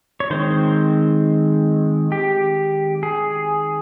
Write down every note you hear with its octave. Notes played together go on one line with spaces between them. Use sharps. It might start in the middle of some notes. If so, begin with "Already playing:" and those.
C#5
D#3 G#3 C4 C5
G4
G#4